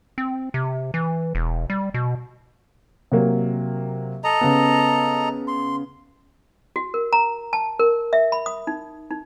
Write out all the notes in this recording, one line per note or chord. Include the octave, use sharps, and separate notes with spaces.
C4
C3
E3
E1
G3
B2
C3 F#3 A#3
A4 D#5 A#5
C#3 B3
C6
F#4
A#4
A#5
A5
A#4
E5
B5
D#6
D#4
D#4